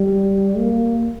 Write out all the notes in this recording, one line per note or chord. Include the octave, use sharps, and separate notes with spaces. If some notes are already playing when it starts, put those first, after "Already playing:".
Already playing: G3
A#3